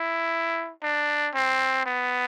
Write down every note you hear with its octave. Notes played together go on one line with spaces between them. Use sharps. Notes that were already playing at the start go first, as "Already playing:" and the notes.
Already playing: E4
D4
C4
B3